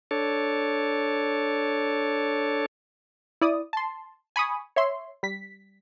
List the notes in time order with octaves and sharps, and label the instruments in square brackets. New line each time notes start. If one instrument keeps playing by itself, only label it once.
[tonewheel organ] D4 A4 C#5
[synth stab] E4 D5 D#6
A5 C6
G#5 B5 C#6 D#6
C#5 E5 C6
G3 B6